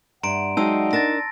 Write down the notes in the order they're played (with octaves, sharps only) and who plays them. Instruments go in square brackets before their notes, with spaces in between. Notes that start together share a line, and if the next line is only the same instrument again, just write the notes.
[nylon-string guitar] G2 [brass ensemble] D5 E5 F#5 [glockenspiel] A#5 C6 D7
[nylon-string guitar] F#3 G#3 C4 [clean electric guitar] D#4 [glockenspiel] A5 E6
[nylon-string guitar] D4 A#4 A5 [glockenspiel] A6 A#6